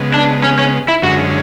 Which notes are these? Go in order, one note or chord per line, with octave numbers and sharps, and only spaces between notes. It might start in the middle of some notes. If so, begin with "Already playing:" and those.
Already playing: C#3 G#3 B3
D4
C#4
C#4
E4
F#2 D3 G#3 C#4 F#4